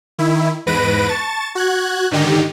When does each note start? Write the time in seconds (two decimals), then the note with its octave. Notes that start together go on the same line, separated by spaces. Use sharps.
0.18 D#3 E4
0.66 E2 G#2 B4 A#6 D7 D#7
1.08 A5 C#6 A6
1.55 F#4 F#6 G#6
2.11 G#2 D3 D#3 D#4 G4